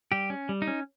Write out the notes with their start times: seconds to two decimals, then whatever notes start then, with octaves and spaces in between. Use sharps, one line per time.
0.12 G3 G4
0.30 C#4
0.49 G3
0.62 D#4
0.67 C#4